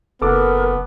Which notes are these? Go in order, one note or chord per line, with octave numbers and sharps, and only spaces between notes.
F#1 B3 A4 A#4 D6